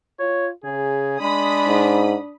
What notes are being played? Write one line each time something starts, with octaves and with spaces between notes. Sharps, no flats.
F4 C#5
C#3 G#4
G#3 D4 B5 D#6
G#2